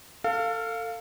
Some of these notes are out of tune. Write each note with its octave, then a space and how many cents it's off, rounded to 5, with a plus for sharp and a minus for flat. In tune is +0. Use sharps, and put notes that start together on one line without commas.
A4 +30 F5 +0